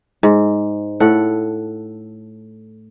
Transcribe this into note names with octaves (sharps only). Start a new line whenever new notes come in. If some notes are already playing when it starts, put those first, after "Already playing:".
G#2
A2 A4 F#5